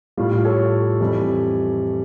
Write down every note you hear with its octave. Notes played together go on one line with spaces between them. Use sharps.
A2 G3 F4
F4
A4 C#5
F2 E3 G3